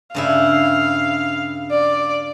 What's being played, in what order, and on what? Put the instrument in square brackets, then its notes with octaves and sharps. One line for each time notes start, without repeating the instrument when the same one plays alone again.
[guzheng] G2 C#3 E4 [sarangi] F5
[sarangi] D5